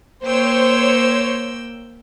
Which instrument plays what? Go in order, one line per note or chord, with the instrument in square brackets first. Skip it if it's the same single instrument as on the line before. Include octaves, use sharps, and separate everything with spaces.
[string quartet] A#3 G5 E6 [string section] C5 C#5